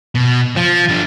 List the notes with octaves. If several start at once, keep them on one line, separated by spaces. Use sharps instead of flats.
B2
F3
G2 D3